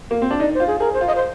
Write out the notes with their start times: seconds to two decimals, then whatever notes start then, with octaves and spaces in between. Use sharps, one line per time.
0.11 A#3
0.22 C4
0.31 D4
0.40 D#4 D5
0.54 C5
0.60 F4
0.67 G#4
0.80 G#4 A#4
0.94 C5
1.01 F4
1.07 D#5
1.15 C5